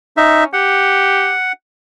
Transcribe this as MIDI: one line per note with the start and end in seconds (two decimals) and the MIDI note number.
0.17 0.48 61
0.17 0.44 63
0.17 0.44 76
0.53 1.33 67
0.53 1.52 78